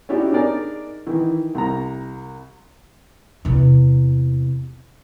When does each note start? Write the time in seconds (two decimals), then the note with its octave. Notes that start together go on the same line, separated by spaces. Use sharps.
0.09 C#4 D#4 E4 F#4 G4 D5
0.31 D4 D#4 G#4 A#4 D5
1.07 D#3 E3 D#4
1.55 C2 A#5
3.45 E2 C3